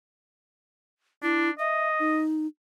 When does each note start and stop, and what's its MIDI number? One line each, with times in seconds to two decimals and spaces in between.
1.23 1.50 62
1.23 1.51 64
1.59 2.21 75
1.59 1.89 76
1.99 2.47 63